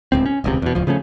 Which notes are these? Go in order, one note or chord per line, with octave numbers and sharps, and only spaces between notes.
D1 C#2 C4
C#4
D#1 C#2 C3
E2 B2
D1 C#2 F3
C#3 F3 A3 C#4